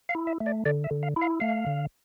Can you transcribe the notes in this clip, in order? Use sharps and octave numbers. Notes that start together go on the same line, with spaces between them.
F5
E4
E5
A3
D5
D3 D5
E5
D3
F5
E4
F5
A3 F5
D3